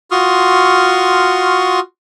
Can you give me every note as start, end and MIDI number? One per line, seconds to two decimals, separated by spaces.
0.11 1.80 65
0.11 1.80 66
0.11 1.80 84
0.11 1.80 85
0.11 1.80 87
0.11 1.80 89